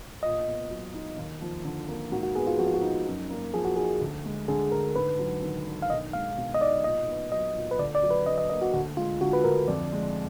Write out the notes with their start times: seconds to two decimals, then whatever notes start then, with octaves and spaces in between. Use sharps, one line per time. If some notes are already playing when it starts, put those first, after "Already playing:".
0.23 A#2 D#5
0.46 B3
0.70 F#3
0.94 D#4
1.17 D#2
1.41 F3
1.64 D3
1.88 A#3
2.12 G#2 F#4
2.23 F#4
2.36 B3 G#4
2.47 F4
2.59 F3 F#4
2.67 F4
2.74 F#4
2.82 D#4
3.06 F#2
3.30 A#3
3.53 F3 G#4
3.65 F#4
3.76 D#4 G#4
4.01 D2
4.25 G#3
4.48 D3 G#4
4.71 D2 A#4
4.95 G#2 B4
5.19 F#3
5.43 D#3
5.67 D4
5.82 F5
5.90 B1 D#5
6.13 G#3 F5
6.37 B2
6.54 D#5
6.61 D#4 D5
6.84 A#2 D#5
7.08 B3
7.31 F#3 D#5
7.55 A#2
7.71 B4
7.79 D2 D5
7.95 D5
8.02 F#3
8.11 B4
8.26 D3 D#5
8.38 D#5
8.50 A#3 D#5
8.62 F#4
8.73 D2 F#4
8.97 G#3 F4
9.21 D3 F#4
9.33 B4
9.44 D2 A#4
9.68 F2 D5
9.92 G#3